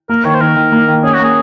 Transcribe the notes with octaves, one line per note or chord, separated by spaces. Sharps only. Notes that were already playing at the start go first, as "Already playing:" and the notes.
A#3 A#4
D#3 C#5
C5
D#3 A#4
D#3
A#3
D#3
C#4 G#4
F#4
A#3 G#4